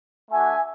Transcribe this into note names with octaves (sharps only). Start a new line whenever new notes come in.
A3 D4 F#4 E5 G#5